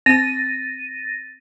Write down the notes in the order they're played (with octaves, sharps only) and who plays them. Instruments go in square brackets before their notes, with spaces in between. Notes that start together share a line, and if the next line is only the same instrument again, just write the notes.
[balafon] C4 [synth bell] A6 A#6 D#7